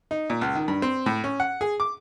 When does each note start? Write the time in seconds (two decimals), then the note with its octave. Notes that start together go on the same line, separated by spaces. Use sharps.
0.11 D#4
0.30 A#2
0.41 C#2
0.55 D#3
0.68 G2
0.82 C4
1.06 A2
1.24 C#4
1.40 F#5
1.61 G#4
1.80 D6